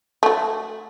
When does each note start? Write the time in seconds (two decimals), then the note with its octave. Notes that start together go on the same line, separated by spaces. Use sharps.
0.23 A3 F#4